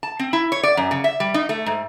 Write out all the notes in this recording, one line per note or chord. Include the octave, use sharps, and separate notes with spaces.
A5
C4
E4
C#5
D5
F#2
C#3
E5
G3
D#4
A3
G#2